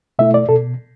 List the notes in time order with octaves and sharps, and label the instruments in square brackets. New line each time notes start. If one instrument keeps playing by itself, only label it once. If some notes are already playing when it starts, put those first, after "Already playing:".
[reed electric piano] B2 A3 E4 E5
D5
B2 A4